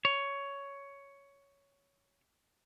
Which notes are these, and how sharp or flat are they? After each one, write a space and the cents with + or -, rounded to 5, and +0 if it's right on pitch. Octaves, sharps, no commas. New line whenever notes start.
C#5 +10